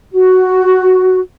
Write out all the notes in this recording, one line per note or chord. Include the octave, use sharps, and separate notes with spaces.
F#4